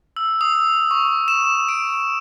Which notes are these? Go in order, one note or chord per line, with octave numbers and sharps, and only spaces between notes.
E6
D#6
C#6
E7
D7